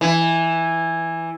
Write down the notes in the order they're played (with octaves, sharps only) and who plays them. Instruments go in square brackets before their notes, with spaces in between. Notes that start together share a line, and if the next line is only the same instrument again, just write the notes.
[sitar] E3